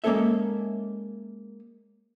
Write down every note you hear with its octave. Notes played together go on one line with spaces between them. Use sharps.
G#3 A#3 C4 C#4 A4 E5